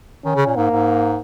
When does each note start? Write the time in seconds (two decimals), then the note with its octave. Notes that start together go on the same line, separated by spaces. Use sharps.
0.25 D#3 C#4
0.35 C#3
0.46 A#2
0.56 G#2 A#3
0.71 G#2